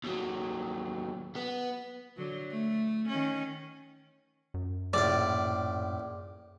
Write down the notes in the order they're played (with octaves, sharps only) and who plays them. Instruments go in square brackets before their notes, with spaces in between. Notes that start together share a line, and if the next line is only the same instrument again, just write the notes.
[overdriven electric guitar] D#2 F#3
B3
[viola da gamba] D3 F#3
A3
D#3 C#4
[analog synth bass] F#2
[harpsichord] A#1 A2 F5 [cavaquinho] D5